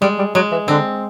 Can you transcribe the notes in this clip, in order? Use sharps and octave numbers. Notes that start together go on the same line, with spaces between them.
G3 G#3
G3
F#3 G#3
E3
D3 C4